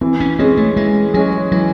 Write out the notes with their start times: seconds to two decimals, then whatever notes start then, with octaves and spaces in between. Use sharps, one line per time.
0.01 E3 C4
0.20 C#4
0.39 G#3 C4 C#4 G#4
0.57 A3
0.76 E3 G#3
1.14 F#3 G#3 C#4 G#4
1.52 E3 F#3